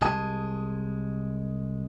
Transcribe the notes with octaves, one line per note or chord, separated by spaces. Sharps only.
C2 G#3 G#4 A5